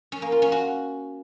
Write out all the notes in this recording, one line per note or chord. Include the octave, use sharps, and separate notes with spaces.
C#4
A#3
F4
C#4
F#4